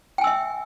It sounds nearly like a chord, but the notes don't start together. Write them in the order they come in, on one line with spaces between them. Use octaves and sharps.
G5 G#5 E6 E5